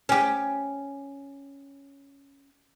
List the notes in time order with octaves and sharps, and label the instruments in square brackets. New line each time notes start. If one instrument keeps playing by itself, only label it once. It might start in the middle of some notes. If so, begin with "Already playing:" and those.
[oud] C#4 G4